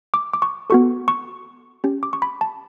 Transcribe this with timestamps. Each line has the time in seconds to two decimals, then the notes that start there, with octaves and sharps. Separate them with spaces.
0.14 D6
0.34 D6
0.42 C#6
0.70 B3 F#4 A4 C#6
1.08 C#6
1.84 C#4 G4
2.03 D6
2.13 C#6
2.22 B5
2.41 A5